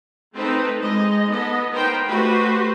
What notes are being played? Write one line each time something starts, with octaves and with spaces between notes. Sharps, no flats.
A3 C4 D#4 A4 B4
G#3 D#4 D#5
B3 A4 D#5
B3 D#4 A#4 C5 G5
A3 F#4 G4 B4 C5